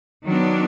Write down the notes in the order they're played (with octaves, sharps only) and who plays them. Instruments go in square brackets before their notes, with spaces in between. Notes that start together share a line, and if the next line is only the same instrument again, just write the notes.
[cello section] D#3 F#3 B3 D4